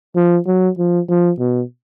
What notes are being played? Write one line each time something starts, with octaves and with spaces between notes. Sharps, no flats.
F3
F#3
F3
F3
B2